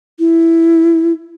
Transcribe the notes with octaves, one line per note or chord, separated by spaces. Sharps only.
E4